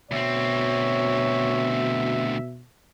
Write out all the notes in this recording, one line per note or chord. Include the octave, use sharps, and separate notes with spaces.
D2 B2 C4 C#5 E5